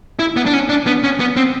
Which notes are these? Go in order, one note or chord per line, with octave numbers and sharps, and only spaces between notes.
E4
B3
D4
C#4
D4
B3
C#4
B3
C4